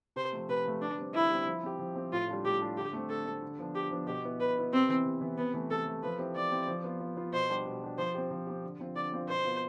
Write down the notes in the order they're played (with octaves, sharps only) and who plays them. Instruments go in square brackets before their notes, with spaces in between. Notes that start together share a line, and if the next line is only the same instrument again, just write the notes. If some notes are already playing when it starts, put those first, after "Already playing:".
[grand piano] C3 [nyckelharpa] C5
[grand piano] F3 A3
[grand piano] C3 [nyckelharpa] B4
[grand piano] F3 A3
[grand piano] D3 [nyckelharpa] D4
[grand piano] G3 C4
[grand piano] D3 [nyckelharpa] E4
[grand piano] G3 C4
F3
C4 G4
F3
C4 G4
[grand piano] A2 [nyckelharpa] F4
[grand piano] G3 D4 F4
[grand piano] A2 [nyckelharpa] G4
[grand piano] G3 D4 F4
[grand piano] D3 [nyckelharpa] G4
[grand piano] A3 C4
[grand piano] D3 [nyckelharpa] A4
[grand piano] A3 C4
D3
F3 B3 D4
[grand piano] D3 [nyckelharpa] G4
[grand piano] F3 B3 D4
[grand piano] B2 [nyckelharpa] G4
[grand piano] B3 E4
[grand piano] B2 [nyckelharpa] B4
[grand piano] B3 E4
[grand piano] C3 [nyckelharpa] C4
[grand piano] E3 B3 E4
C3
E3 B3 E4
[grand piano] C3 [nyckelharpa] B3
[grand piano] E3 A3
[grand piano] C3 [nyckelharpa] A4
[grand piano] E3 A3
[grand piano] F3 [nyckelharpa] B4
[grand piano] C4 E4 G4
[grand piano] F3 [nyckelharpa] D5
[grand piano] C4 E4 G4
F3
B3 F4
F3
B3 F4
[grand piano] B2 [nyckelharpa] C5
[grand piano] G3 D4 G4
B2
G3 D4 G4
[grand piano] F3 [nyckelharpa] C5
[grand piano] C4 G4
F3
C4 G4
D3
F3 C4 F4
[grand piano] D3 [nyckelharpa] D5
[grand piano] F3 C4 F4
[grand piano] B2 [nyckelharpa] C5
[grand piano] B3 F4